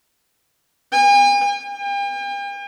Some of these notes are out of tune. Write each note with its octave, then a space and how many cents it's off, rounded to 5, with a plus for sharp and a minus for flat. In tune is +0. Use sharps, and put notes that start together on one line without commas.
G#5 -45
G5 +45